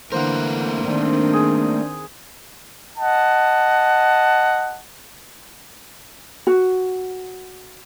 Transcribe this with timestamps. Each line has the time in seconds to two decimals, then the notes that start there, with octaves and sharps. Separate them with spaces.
0.12 D3 E3 A3 A#3 A#4 C5 F#5
0.85 D#3 C4 D4
1.33 G#4
2.97 D#5 F#5 A5
6.47 F#4